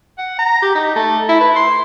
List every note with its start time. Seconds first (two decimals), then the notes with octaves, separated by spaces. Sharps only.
0.18 F#5
0.39 A#5
0.62 G4
0.75 D#4
0.95 A3
1.29 E4
1.41 B4
1.56 C6